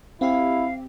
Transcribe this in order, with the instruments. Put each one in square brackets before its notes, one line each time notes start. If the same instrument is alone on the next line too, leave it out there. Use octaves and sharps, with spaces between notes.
[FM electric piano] C4 G4 [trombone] E4 [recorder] F5